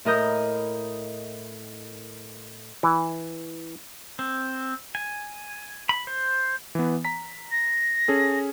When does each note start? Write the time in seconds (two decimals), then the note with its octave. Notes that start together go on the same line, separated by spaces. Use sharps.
0.05 A2 E4 A#4 D#5 D#6 G6
2.83 E3
4.19 C4
4.95 G#5
5.89 B5
6.07 C5
6.75 E3 B3
7.05 A#5 B6
7.52 A#6
8.08 C#4 G#4 A4